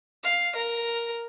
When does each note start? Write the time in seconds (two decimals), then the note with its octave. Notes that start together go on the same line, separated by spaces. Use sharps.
0.24 F5
0.55 A#4